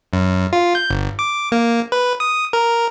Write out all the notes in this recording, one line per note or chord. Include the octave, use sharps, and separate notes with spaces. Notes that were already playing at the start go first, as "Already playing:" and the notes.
F#2
F4
G6
G1
D6
A#3
B4
D#6
A#4